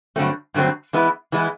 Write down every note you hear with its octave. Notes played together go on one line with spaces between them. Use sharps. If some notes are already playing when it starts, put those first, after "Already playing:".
G2 D3 F#3 A3 C4
G2 D3 F#3 A3 C4
E3 G#3 B3 E4
E3 G#3 B3 E4